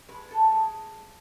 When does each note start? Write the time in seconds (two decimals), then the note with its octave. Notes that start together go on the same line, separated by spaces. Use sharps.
0.08 G#3 B4
0.31 A4
0.52 G#3